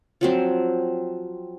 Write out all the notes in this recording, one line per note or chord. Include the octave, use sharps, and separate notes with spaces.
F3 F#3 C4